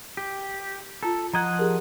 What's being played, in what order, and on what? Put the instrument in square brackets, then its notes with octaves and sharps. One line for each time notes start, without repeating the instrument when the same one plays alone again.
[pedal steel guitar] G4
[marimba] F4 A5 A#5 [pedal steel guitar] A4
[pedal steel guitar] F3 D#5 F#5 [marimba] A#5 G#6
[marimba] G4 G#4 A#4